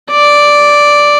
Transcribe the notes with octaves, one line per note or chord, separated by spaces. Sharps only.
D5